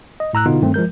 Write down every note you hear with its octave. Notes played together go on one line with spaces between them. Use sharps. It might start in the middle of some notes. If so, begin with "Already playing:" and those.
D#5
A2 A#5 E6 F#6
B2 D3 B3 D#4 F4
G2 D#3 A3 C4
F3 G#3 A#4 G6